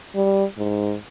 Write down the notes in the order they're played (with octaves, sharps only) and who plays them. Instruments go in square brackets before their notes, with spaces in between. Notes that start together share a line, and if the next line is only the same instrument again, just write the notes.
[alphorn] G3
G#2